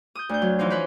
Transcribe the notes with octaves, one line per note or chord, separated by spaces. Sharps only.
D#6 G6
D2 G6
F#3
E3 F3 D#4 C5
C#4 B4 C5